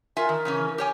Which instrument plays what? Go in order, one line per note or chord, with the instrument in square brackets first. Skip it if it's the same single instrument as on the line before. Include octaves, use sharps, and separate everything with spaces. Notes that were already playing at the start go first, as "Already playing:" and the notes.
[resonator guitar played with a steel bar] F4 E5 G#5 [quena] A#4
[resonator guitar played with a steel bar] D#3
C#3 E3 C#4
G4 C#5 G#5